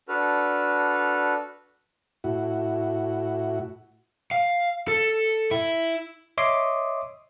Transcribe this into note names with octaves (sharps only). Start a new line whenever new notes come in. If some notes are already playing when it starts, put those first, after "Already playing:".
D4 F#4 A4 B4 F6
A2 E4 F#4
F5
A4
E4
C#5 D#5 E5 C6 D6 D#6